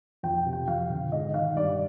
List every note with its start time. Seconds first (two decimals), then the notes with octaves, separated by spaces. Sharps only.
0.23 F2 G5
0.46 C3
0.53 G5
0.68 F2 F5
0.90 D3
1.12 G#2 D#5
1.34 D#3 F5
1.56 G2 D5